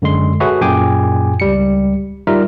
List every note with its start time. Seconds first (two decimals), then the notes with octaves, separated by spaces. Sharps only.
0.02 F#2 D3 G#3 C6
0.40 F#4 G#4 A4 B4 C#5 E5
0.61 F#2 A#2 G#4 G5 G#5 D6
1.40 C#2 G3 C#7
2.27 G3 D#4 F4 A#4 E5